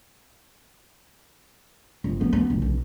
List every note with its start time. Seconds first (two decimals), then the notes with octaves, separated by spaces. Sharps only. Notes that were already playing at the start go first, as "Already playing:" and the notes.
2.04 G1
2.21 B3
2.33 B3
2.50 D1
2.62 B1